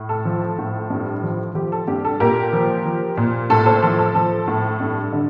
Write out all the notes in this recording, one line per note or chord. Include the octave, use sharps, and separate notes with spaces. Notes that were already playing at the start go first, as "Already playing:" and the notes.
Already playing: A2
A4
F3
A2
G2
F3
F3 G4
A4
G2 G4
A4
A#2 G4 A#4
F3
F3
A#2
A2 A4
A4 C5
F3 A4
A4
F3 A4
A2
G2
D3